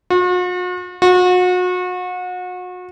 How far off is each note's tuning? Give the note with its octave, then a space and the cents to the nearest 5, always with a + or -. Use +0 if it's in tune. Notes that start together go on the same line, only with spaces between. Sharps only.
F#4 -45
F#4 -35